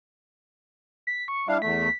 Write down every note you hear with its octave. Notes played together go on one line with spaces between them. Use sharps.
B6
C#6
G3 D4 E4 F5
E2 A3 B6